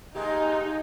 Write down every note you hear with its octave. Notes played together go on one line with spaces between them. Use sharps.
G#3 A#3 D#4 G4